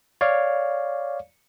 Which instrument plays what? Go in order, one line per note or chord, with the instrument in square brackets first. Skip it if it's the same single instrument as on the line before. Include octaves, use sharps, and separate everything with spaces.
[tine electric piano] C#5 D5 F5